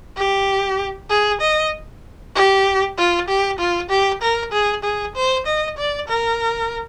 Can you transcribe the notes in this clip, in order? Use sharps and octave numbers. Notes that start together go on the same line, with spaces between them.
G4
G#4
D#5
G4
F4
G4
F4
G4
A#4
G#4
G#4
C5
D#5
D5
A#4